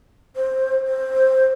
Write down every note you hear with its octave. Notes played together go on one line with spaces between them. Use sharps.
C5
C5